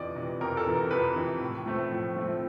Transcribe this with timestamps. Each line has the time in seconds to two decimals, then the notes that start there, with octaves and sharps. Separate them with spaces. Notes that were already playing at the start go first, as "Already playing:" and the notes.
Already playing: F2 C3 E3 D5 D#5
0.15 C3 E3
0.41 F2 A#4
0.57 A4
0.66 C3 E3
0.75 A#4
0.91 F2 B4
1.16 C3 E3
1.41 A2
1.66 F3 A3 C4
1.91 A2
2.17 F3 A3 C4